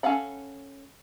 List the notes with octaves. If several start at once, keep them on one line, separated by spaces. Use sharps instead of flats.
C#4 A4 F5 F#5 B5